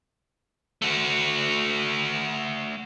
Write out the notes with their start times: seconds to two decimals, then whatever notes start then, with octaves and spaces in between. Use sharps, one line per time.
0.82 A3 F#4